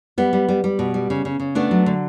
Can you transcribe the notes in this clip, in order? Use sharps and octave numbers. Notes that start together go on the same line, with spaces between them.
G3 B3
G3
G3
G3
B2
G3
C#3
C#3
C#3
A3 B3 D4
F#3
D3